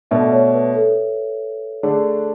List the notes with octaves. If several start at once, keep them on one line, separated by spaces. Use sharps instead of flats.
B2 A3 D4 E5
C#5
B4
A4
D3 A3 D4 G#4